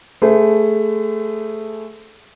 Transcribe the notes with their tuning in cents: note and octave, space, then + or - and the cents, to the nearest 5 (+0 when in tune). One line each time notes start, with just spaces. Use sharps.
A3 +0 G#4 +0 C5 -40